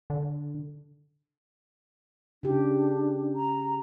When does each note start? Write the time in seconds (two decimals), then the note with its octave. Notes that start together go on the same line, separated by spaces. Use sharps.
0.10 D3
2.43 C#3 D4 G4
3.35 A#5